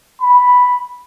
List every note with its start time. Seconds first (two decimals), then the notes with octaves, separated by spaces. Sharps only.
0.22 B5